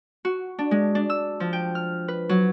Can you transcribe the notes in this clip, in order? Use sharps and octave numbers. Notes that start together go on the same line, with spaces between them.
F#4
D4
G#3
D4
E6
F3
G5
F6
B4
F#3